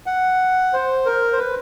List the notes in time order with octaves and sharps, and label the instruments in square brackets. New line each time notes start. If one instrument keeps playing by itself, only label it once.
[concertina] F#5
C5
A#4
C5
B4